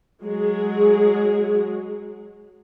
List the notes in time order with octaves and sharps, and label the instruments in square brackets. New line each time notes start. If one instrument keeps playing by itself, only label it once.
[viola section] F#3 G#3 G#4